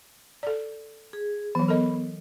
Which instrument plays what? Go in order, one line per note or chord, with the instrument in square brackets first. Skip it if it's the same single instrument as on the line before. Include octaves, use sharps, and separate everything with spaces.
[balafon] A4 D5
[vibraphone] G#4
[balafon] E3 F#3 [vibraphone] B3
[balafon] A4 A#4 D#5